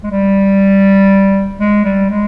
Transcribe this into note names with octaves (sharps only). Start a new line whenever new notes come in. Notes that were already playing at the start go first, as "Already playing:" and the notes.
G#3
G3
G#3
G3
G#3